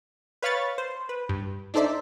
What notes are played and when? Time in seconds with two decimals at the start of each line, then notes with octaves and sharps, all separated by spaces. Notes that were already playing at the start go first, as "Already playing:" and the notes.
0.42 B4 C#5 F5 B5 C#6 A6
0.78 C5
1.09 B4
1.29 G2
1.74 D4 D#4 A4 C5 D5 E5